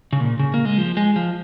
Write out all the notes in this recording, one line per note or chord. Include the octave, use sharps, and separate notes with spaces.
C#3
A#2
C#3
A#3
G#3
F3
G#3
F3